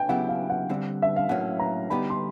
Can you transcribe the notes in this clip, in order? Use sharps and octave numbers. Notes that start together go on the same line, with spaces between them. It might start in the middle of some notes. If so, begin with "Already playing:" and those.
Already playing: G5 G#5
C#3 F#3 B3 E4 G4 F#5
F5
F#5
D3 G3 C4
E5
F5
A2 F#3 A#3 C#4 F#5
A#5
D3 G3 B3 D#4 G4 B5
C6